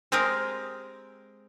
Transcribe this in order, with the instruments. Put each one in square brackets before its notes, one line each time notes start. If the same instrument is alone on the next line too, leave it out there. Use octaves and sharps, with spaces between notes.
[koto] G#3 C4 G4 G#4 A#4